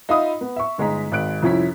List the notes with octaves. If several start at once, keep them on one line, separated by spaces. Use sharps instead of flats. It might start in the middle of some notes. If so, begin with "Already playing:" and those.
D#4 F4 E5 F5 B5 D#6
B3
E5 C#6
G1 G#3 D#4 G#4 A#5 B6
G#1 G#3 F#6 D7
C2 F2 F3 C#4 E4 B6